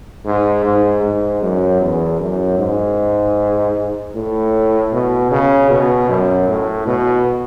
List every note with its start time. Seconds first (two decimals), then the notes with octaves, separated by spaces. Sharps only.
0.25 G#2
0.64 G#2
1.03 G#2
1.42 F#2
1.81 E2
2.20 F#2
2.59 G#2
4.15 A2
4.93 B2
5.31 C#3
5.70 B2
6.09 F#2
6.48 A2
6.87 B2